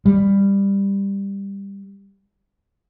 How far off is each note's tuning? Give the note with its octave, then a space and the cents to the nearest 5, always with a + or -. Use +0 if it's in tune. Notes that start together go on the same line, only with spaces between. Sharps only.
G3 +15